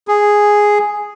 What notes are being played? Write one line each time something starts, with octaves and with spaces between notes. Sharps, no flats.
G#4